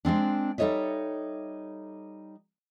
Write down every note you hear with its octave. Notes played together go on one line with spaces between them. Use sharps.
G#3 A#3 C4 D4
G3 D#4 A4 C#5 D#5 E5